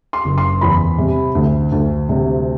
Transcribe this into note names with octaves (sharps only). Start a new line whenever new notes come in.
C6
F#1
C6
E2 B5
C3
D2
D2
C3